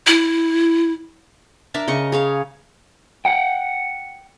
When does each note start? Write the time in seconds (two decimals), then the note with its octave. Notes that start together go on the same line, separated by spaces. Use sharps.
0.07 E4
1.74 D4 A#4 E5 A5
1.88 C#3 D#5 C#6
2.12 G#4 C#5 F5
3.25 F#5 G5